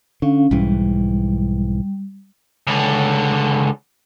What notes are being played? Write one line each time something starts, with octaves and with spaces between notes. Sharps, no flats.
D3 C#4 F5
B1 G#2 E3 G3
C#2 D3